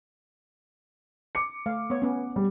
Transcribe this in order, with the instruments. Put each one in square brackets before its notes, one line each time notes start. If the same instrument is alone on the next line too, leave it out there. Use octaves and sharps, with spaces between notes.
[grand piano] D6 C#7
[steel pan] A3 F5
B3 C#5
B3 C#4
[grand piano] G3